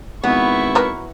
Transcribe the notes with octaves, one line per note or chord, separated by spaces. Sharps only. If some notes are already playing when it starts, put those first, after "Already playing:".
G#1 B3 E4 C#6
F#3 A#4 B4